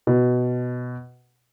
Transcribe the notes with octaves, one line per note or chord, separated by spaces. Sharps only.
B2